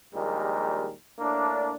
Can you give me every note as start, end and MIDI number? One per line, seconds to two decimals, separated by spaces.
0.14 0.92 34
0.14 0.92 39
0.14 0.92 55
0.14 0.92 56
0.14 0.92 70
1.19 1.75 45
1.19 1.75 58
1.19 1.75 62